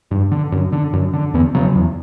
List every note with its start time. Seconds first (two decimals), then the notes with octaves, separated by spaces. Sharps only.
0.11 G2
0.32 D3
0.52 F#2
0.72 D3
0.93 F#2
1.14 D3
1.34 E2 B3
1.54 C#3 F#3
1.75 E2